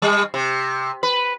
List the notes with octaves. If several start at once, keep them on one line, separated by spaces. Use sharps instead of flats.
G3
C3
B4